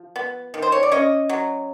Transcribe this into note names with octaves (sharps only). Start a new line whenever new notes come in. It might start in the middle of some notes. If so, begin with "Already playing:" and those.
Already playing: F3
B3
D#3
C5
C#5
D5
C#4 C#5 D#5
F#3